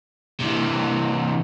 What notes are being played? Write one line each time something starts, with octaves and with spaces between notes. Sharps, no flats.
C3 E3